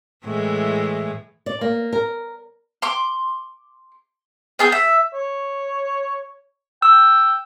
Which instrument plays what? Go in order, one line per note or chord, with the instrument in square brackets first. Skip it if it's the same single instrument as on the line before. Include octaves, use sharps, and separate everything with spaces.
[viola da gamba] A2 E3 G#3
[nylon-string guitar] D5
A#3
A#4
[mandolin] C6 D6
B3 G#4 G6
E5
[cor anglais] C#5
[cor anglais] G5 [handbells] E6